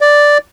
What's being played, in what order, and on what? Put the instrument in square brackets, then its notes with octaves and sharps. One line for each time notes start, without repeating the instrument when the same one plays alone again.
[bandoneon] D5